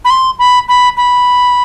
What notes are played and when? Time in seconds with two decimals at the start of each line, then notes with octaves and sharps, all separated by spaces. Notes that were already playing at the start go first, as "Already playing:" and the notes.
0.05 B5
0.10 C6
0.39 B5
0.69 B5
0.97 B5